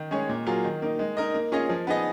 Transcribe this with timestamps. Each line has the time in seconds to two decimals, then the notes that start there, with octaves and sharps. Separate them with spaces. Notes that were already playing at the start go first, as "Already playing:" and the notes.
Already playing: D#3
0.11 G#3 C#4 G#4 C#5
0.29 A#2
0.47 F#3 A#3 F4 G#4
0.65 D#3
0.82 A#3 D#4
0.99 G#3
1.17 D#4 A#4 D#5
1.34 A#3
1.52 C#4 F4 G#4 D#5
1.69 F3
1.87 B3 D#4 G#4 D#5